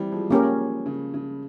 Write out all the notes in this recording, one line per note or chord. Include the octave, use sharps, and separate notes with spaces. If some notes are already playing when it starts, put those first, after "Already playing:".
Already playing: E3 G3 C4
F3 G#3
A#3 C#4 G4 A#4
C#3
C#3